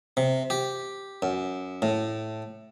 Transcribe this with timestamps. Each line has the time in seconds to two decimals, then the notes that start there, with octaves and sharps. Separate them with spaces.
0.17 C3
0.50 G4
1.22 F#2
1.82 A2